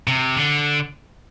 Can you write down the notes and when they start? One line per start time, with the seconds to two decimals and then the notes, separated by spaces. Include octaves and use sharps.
0.07 C3
0.36 D3